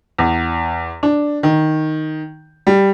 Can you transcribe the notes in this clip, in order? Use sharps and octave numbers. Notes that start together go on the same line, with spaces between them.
E2
D4
D#3
G3